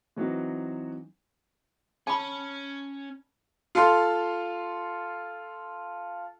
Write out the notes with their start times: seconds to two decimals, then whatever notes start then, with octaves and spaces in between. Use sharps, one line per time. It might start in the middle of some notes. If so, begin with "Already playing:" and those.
0.16 E3 F#3 C4 D#4 F#4
2.07 C#4 A5 B5
3.75 F4 A4 F5 C6